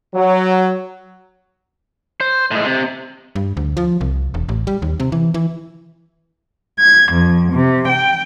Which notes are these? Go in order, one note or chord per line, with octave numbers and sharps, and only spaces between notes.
F#3
C5
A2 G#3
C3
G2
D2
F3
C2
E1
A1
G3
D#2
C3
E3
E3
G#6
F2
C3
G5